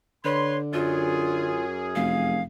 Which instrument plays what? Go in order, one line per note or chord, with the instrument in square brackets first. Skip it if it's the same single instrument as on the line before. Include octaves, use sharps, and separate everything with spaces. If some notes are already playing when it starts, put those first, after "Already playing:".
[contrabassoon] D3 [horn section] B4 C6 [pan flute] C#5
[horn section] F#2 G#4 [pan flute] F4
[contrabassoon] F1 [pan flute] F5